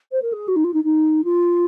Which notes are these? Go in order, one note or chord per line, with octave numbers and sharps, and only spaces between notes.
C5
A#4
G#4
F#4
D#4
F4
D#4
D#4
F4